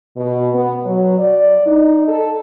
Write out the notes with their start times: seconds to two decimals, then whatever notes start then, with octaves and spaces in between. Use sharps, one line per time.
0.17 B2
0.54 B3
0.84 F#3
1.19 D5
1.66 D#4
2.08 A4